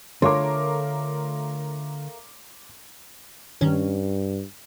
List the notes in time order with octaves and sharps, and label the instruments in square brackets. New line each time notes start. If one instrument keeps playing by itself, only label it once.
[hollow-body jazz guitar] D3 [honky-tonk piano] A3 F4 A#4 [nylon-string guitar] C#5 [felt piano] C6 D6
[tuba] G2 [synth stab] D#3 C#4